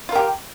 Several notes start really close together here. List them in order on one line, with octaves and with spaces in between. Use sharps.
F4 A#4 G4